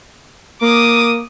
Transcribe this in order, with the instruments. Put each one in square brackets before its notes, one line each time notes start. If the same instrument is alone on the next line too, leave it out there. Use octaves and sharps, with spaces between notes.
[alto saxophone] A#3 [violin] D6 D#6